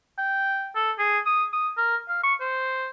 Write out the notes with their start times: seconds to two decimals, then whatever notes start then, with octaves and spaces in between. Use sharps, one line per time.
0.18 G5
0.76 A4
0.99 G#4
1.26 D#6
1.53 D#6
1.77 A#4
2.09 F5
2.23 C#6
2.41 C5